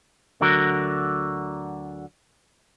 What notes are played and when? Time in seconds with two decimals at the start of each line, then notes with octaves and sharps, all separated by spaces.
0.41 D2 D3 F#3 F#4 A#4